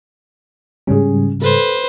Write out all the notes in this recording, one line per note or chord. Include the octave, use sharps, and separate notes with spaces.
G#2 C#3 G3 C#4 G#4
A4 B4 C5